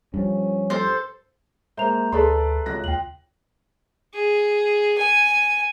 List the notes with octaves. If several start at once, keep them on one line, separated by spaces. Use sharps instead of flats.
G2 F3 C#4
A4 C5
G#3 A#3 C5 E5 A#5 F7
D2 G#4 A4 B4 D5 C6
C#2 F#6 A#6
D#2 F4 G5 F#7
G#4
G#5